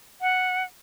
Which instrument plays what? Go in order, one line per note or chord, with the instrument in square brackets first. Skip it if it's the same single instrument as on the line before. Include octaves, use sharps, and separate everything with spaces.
[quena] F#5